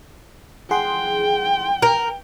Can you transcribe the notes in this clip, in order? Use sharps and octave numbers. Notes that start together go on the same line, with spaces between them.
G#4 F#5 G5 C6
A#4